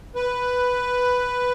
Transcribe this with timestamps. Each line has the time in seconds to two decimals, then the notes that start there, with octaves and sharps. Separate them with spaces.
0.15 B4